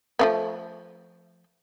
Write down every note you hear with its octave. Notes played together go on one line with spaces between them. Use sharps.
F3 A3 B3